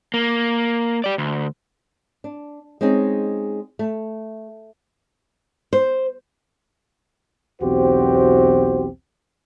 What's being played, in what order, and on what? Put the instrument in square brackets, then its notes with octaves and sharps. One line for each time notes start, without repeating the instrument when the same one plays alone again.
[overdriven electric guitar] A#3
G4 D5
D2
[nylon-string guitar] D4
G#3 C4 C#4 D#4 G#4
A3
C5
[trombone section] B1 E2 C4 F#4 G4 C5